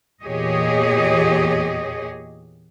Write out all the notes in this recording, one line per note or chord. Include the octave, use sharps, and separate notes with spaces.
E2 A#2 G4 G#4 C#5 D#5